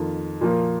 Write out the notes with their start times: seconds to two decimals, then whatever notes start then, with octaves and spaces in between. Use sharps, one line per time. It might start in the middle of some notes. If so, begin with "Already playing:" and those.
Already playing: F2 D#3 A#3 F4
0.41 A#2 F3 A#3